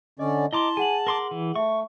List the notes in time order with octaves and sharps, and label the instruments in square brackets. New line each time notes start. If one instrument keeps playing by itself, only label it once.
[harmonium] D3 C#4 D5 [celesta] D#5
[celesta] E4 C6 G7 [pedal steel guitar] D#5 A#5 D6 [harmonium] A5
[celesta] G#4 F#5 F#7 [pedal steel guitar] G#5
[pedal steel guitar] A#4 C6 D6
E3
[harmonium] A3 [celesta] E5 [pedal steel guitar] C#6